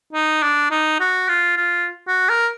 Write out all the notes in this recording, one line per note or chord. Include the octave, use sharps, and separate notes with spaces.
D#4
D4
D#4
F#4
F4
F4
F#4
A#4